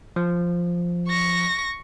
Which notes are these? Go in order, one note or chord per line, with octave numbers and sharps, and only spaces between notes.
F3
C#6 A#6